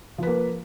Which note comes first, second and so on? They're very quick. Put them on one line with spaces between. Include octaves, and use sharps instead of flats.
F3 B4 A#3